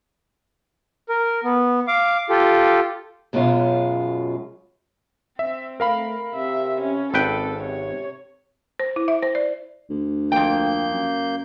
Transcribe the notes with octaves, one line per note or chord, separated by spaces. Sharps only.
A#4
B3
F5 D6
F4 G4 A4
F#2 B2 G#3 C#4 F4 C#5
C4 E5
A3 A#4 F5 B5
C3 E5
C#4
G#1 C4 A4 B4 G5
C3 C#5
C5
E4
E5
C5
D5
D2
F2 A#3 G5 G6
F#2